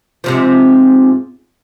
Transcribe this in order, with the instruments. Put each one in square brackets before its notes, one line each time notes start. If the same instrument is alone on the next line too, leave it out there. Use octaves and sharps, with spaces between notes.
[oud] G#2 C3 F3